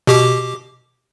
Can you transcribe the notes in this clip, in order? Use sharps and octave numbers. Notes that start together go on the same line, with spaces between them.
B2 G4 D6